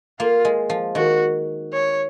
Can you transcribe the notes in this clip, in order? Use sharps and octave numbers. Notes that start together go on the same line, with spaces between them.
A#3 F4
G#3
F3
D#3 F#4
C#5